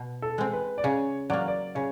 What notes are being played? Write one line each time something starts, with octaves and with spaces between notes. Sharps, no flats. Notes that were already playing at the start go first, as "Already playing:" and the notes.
Already playing: B2
A4
G#3 C4
B4
D5
C#3 C#5
F#3 A#3 D5
D5
C#3 C#5